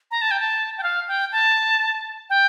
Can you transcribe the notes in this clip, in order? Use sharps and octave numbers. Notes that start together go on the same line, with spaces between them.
A#5
A5
G5
A5
G5
F5
G5
A5
G5